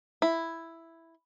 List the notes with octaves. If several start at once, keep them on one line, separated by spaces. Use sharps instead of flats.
E4